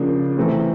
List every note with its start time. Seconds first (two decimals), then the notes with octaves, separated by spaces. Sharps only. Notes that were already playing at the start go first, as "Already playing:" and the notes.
Already playing: C#3 F3 A#3 D4
0.37 C3 E3 A3 C4